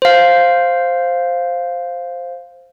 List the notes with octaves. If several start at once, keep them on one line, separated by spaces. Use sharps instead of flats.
C5 F5